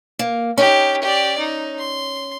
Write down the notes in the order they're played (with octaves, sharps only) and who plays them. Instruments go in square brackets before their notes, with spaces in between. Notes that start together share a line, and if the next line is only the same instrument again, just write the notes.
[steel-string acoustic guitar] A#3
[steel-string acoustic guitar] C#4 [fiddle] D#4 G4
[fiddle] G4 D5
D#4
C6